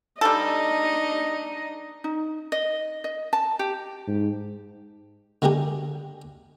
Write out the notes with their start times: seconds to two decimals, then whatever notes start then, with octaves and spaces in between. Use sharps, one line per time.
0.21 G3 D4 D#4 A4 D#5
2.04 D#4
2.52 D#5
3.04 D#5
3.33 A5
3.59 G4
4.07 G#2
5.42 D3 G#3 A#3 G4 G#4